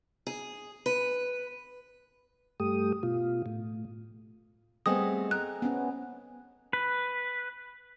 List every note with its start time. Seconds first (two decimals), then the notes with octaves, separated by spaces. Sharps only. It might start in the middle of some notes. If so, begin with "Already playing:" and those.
0.27 G#4
0.86 B4
2.60 G2 A3 G4 D#6
3.03 B2 F4
3.46 A2
4.86 G3 A3 B3 C4 G#4 D#5 D#6
5.31 A#4 F#6
5.62 B3 C#4
6.73 B4